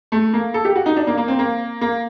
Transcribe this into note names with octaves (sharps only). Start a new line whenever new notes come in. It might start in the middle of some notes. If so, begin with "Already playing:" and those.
A3
A#3
A4
G4
F#4
D#4
D4
A#3
A#3
C4
A#3
A#3